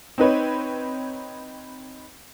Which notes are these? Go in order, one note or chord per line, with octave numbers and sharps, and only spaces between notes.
C4 D#4 B4 C#5